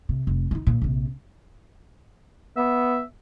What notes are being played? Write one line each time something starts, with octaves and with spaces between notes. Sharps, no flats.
C3
F1
F3 D#4
A#2
A#1 C3
B3 E5